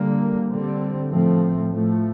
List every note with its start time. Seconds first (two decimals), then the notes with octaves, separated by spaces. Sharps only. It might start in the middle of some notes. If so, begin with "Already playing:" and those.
Already playing: D3 G3 A#3
0.50 D3 G3 C4
1.10 A2 F3 A3 C4
1.71 A2 F3 A3